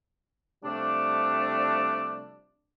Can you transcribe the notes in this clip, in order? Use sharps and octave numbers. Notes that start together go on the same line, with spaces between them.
C3 F3 G3 A3 D4